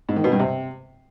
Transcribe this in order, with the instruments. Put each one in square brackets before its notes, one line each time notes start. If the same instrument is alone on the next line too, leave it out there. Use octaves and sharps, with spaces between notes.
[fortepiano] G#2
D#3
B2
G2
C3